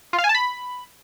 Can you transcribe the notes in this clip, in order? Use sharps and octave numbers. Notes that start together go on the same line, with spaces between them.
F4
F5
G#5
A5
B5